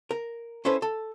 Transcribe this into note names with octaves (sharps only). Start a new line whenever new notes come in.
A#4
C#4 E4 A4 B4 C5
A4